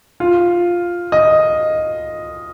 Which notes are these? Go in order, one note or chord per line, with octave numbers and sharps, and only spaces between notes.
F4
D#5